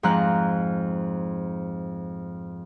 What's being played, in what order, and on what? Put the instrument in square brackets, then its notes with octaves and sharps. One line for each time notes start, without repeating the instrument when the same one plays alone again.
[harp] F2 G#2 F3 A#5 F6 F#6